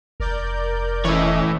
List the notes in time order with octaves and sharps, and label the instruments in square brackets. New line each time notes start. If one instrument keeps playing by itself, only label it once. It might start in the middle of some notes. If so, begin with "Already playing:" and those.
[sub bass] F1 [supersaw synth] A#4 D5 G6
[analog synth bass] E3 [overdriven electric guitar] A3 C#5 [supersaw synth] C#4 D#5 E5